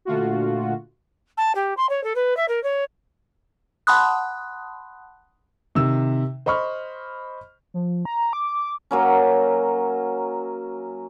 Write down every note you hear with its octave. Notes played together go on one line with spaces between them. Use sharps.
A#2 D3 A3 F4 F#4
A5
G4
C6
C#5
A4
B4
E5
A#4
C#5
F#5 A5 B5 C6 D#6 F#6
C3 D#3 E6
C5 D#5 B5 C#6 F6
F3
A#5
D6
F#3 A#3 C#4